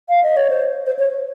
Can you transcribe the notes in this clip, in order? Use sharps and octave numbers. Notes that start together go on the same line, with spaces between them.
F5
D#5
C#5
C5
C5
C#5